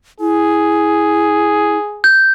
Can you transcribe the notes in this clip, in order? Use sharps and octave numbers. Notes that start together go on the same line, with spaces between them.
E4 G#4
G6